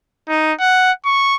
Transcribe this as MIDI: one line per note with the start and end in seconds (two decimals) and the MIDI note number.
0.29 0.53 63
0.60 0.92 78
1.05 1.35 85